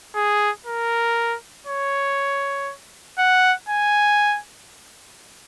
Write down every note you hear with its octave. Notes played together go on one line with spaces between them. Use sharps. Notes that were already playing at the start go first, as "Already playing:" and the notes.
G#4
A#4
C#5
F#5
G#5